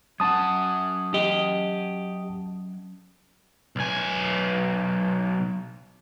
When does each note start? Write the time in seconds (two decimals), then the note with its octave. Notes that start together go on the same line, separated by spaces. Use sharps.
0.20 F#3 C#4 F#5 A5 D#6
1.14 G4 D#5
3.76 B1 G#5